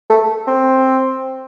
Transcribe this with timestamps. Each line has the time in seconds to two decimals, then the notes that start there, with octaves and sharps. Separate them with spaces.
0.10 A3
0.47 C4